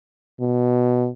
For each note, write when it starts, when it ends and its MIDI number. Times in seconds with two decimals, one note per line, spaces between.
0.40 1.09 47